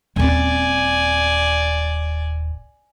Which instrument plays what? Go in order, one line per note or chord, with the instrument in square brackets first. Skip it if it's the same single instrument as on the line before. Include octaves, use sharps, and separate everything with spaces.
[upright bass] D#1 C4 [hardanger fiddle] D5 G#5